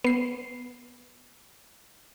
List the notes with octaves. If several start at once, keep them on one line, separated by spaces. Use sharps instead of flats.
B3 C7